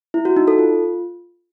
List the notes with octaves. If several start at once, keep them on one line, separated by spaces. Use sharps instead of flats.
E4
F#4
D#4
A4
F4